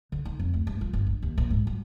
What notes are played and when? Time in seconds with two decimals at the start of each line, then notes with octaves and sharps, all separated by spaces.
0.12 D3
0.25 D#4
0.39 F2
0.53 D2
0.67 G2
0.81 F3
0.93 G1
1.07 D4
1.22 D#2
1.38 A#1
1.50 G#2
1.67 F#3